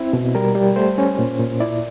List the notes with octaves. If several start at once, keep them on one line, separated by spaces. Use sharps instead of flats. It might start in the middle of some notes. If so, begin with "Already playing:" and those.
Already playing: C4 E4
B2
G3 A#4
G3
A3 C5
C#4
A#2
A#2
E4 D5